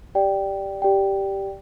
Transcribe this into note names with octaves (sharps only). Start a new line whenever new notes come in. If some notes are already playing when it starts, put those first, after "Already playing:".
G4 D5 G5
G4 D5 G5